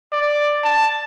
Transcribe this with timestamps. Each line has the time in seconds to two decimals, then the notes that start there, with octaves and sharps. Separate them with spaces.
0.12 D5
0.64 A5